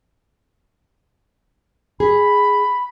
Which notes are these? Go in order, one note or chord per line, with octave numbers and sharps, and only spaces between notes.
G#4 B5